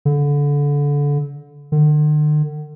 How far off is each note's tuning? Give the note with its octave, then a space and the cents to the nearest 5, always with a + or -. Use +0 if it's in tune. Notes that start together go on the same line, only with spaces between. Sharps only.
D3 -25
D3 +45